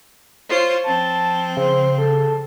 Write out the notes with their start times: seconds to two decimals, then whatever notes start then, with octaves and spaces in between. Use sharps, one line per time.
0.48 F4 C5 C#5
0.84 F3 C4 A5
1.57 C#3 C5
1.98 A4